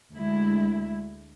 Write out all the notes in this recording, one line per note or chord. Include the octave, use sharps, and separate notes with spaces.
D2 G#3 E4